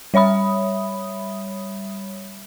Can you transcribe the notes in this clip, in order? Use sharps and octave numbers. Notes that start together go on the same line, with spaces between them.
G3 C#5 E5 B5 D#6